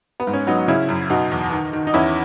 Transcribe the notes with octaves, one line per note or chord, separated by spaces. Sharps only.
B3
G#2
C#4
F#3 B3 D#4
C#3 C#4 E4
F#2
B2 D#4 F#4
E2
D#3
D#3
D#4
E2 C#4 E4